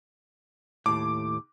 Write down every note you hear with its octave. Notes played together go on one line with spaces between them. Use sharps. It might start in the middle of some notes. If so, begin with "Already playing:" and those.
D#2 A2 D6